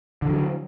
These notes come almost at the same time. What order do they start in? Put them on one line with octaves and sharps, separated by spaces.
D3 D#3 F#3